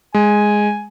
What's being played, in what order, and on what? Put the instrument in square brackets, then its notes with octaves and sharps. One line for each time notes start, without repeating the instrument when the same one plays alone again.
[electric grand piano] G#3 [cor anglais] G#5